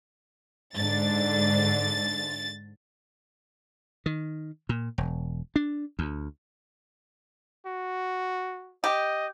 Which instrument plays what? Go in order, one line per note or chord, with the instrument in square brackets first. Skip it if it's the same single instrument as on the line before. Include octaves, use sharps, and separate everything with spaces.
[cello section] G#2 D3 D4 [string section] A6
[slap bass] D#3
A#2
E1
D4
D2
[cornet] F#4
[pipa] G4 [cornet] D#5